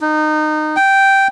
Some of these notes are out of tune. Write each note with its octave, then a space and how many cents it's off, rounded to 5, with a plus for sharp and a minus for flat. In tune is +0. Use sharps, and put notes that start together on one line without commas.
D#4 -25
G5 -5